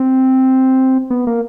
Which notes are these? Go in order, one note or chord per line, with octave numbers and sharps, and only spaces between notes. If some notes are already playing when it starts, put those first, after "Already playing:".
Already playing: C4
B3
A#3